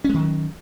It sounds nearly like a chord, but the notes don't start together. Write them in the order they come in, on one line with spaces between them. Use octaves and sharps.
C#4 G#3 D#3 F#3